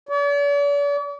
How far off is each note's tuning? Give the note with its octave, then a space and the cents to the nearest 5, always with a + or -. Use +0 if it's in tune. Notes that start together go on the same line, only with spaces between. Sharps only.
D5 -45